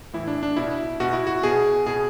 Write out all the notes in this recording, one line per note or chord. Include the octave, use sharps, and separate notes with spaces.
A2 E3 E4
D4
D4
B2 E4
B2 F#4
E4
F#4
B2 G#4
B2 G#4